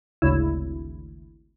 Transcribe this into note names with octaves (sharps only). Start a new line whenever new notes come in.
G#1 D2 C#3 E4